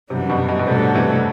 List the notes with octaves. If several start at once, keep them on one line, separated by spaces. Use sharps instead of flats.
F#2 C3 E3 G3 D4 F#4
B2 D3
B2
B2
A2 C3 G3 D4 F#4 A4
C3 E3